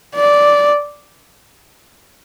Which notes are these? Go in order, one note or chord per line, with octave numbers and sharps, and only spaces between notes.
D5